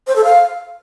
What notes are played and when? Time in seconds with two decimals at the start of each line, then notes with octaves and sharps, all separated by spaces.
0.07 C5
0.16 A4
0.24 F5